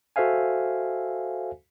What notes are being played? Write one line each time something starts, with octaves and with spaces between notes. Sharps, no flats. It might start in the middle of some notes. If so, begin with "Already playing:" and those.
F#4 A4 C5 E5 F5 G#5